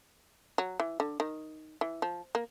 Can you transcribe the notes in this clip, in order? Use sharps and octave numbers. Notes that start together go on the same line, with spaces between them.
F#3
E3
D3
D#3
E3
F3
A#3